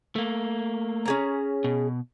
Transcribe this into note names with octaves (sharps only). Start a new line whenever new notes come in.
A3 A#3
C#4 G#4 A#5
B2